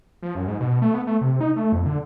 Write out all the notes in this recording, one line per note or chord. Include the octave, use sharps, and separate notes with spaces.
F3
F#2
G#2
B2
A3
B3
A3
C3
D#4
A3
F2
D3